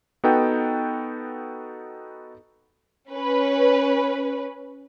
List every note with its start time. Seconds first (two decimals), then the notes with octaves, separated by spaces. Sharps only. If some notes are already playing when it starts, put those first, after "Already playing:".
0.24 B3 D#4 F#4 A4 B4 G5
3.12 C#4 B4